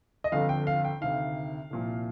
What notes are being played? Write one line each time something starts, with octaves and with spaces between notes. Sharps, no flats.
D#5
G1 F2 D3 F3 F5
G5
F5
G5
D2 C3 D#3 F5
C2 A#2 F3